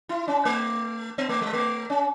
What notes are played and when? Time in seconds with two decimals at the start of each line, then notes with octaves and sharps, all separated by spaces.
0.09 E4
0.28 C#4
0.45 A3
1.18 B3
1.29 A3
1.42 G#3
1.53 A3
1.90 C#4